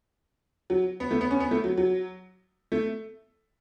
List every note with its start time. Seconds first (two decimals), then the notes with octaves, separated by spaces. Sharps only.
0.70 F#3
1.00 B3
1.11 A3
1.21 B3
1.31 C#4
1.40 B3
1.51 A3
1.64 F#3
1.78 F#3
2.72 A3